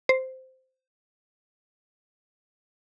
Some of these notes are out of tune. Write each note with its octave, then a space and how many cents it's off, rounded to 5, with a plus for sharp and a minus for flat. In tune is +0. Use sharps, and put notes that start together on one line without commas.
C5 -10